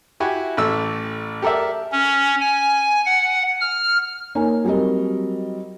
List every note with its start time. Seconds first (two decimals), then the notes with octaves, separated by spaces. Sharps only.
0.20 E4 F#4 G4 G#5 B5
0.57 A1 A3 E6
1.42 G4 A4 A#4 D5 E5
1.92 C#4
2.40 G#5
3.06 F#5
3.61 F6
4.35 A#3 D#4 C#5 G#5
4.64 F#3 G3 C4 A#4 D#5